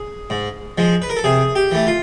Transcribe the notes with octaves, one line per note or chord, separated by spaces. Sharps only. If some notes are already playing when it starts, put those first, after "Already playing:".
Already playing: G#4
G#2
F3 G#3
B4
A#4
A4
C3 G#4
G4
E3 A3
F4